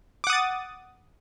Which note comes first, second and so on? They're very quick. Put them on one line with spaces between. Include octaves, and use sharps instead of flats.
D6 F#5 D#6 A6